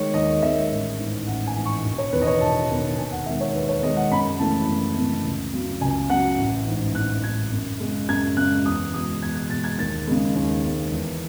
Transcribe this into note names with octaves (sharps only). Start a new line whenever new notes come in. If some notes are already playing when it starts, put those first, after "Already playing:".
Already playing: D#3 G#3 C#5
D#2 D#5
D#3 G#3 E5
A1
G#2 E3
A1 F#5
G#5
G#2 E3
C#6
E1
C#5
E2 D#3 B4
D#5
C#5
E1 A5
E2 D#3
D#2 G#5
F#5
D#3 G#3 E5
C#5
D#2 B4
C#5
D#3 G#3 D#5
F#5
F#2 B5
C#3 E3 A3 A5
F#2
C#3 E3 A3
C#2
C#3 F#3
C#2 G#5
C#3 F#3 F#5
A1
G#2 E3
A1 F#6
G#2 E3 G#6
F#2
C#3 G#3
F#2 G#6
C#3 G#3 F#6
E2 D#6
B2 G#3 D#6
E2 G#6
G#6
B2 G#3 A6
G#6
D#2 A6
C#3 G#3
D#2
C#3 G#3
E2